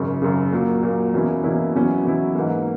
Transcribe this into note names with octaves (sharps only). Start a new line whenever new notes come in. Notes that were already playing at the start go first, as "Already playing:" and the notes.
Already playing: G#1 F#2 C#3
G#1 F#2 C#3
A#2 F#3 A#3
A#2 F#3 A#3
E2 B2 A#3 C#4 E4
E2 B2 A#3 C#4 E4
E2 B2 F#3 C#4 E4
E2 B2 F#3 C#4 E4
G#2 E3 A#3